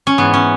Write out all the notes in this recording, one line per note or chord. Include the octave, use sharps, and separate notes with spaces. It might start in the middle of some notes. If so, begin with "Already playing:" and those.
C#4
G#2 E3 B3
C#4